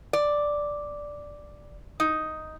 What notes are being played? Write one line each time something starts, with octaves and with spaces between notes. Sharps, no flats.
D5
D#4